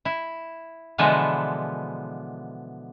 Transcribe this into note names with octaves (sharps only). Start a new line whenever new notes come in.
E4
B2 D3 E3 F3 G#3 B3